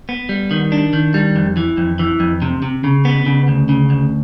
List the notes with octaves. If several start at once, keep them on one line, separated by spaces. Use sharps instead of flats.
B3
G3
D#3
D4
D#3
G3
F2
E3
F2
E3
F2
C3
C3
C#3
B3
C#3
D2
C#3
D2